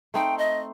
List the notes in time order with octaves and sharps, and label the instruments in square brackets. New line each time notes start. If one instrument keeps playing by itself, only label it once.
[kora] A3 C4 D#4 [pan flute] G5
[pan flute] D#5